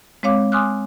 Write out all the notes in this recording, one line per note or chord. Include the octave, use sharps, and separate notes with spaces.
G#3 C4 C#5 F5 D6
G#5 C6 D6 D#6 F6 F#6